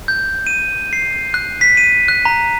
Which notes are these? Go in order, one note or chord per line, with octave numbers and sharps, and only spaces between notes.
G6
D#7
C7
F#6
B6
D#7
F#6
A#5